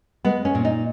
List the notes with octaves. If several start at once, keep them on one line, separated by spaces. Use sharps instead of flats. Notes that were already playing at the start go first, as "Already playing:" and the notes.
G#3 B3
C#4
A#2
D#4